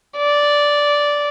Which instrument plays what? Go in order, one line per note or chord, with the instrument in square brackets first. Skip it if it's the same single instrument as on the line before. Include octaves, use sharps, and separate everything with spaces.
[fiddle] D5